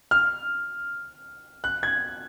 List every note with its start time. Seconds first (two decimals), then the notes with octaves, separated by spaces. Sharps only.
0.11 F6
1.64 F#6
1.83 G#6